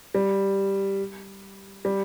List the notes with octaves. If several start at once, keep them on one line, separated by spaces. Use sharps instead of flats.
G3
G3